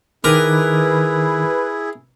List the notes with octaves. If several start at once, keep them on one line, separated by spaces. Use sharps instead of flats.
D#3 E4 G#4 A#4 B4 D6